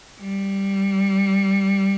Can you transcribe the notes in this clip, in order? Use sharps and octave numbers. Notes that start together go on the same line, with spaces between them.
G3